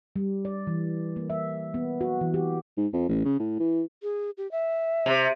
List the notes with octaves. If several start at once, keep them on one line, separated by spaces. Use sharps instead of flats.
G3
D5
E3
A#3
E5
B3
F#4
E3
G4
G#2
F2
A1
C#3
A2
E3
G#4
G4
E5
C3